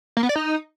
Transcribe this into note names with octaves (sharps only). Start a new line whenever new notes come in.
A#3
B3
D5
D#4